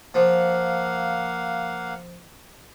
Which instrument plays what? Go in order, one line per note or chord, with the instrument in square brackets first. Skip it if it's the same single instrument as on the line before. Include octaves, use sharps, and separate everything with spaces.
[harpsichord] F3 [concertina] A#3 F5 F#5